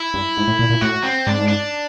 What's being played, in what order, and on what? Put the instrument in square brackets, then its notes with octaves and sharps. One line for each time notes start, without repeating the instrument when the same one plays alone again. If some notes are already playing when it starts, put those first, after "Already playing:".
Already playing: [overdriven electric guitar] E4
[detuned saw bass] G2
G#2
A2
A#2
A#2
[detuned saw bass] A2 [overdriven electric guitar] F#4
[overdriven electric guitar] C4
[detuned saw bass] G#2 [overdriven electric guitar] D4
[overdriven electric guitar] D4